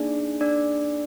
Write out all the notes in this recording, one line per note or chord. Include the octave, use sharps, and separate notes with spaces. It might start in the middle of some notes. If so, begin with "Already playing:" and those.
Already playing: A#3 D4 D#4 G#4 D5
D4 D5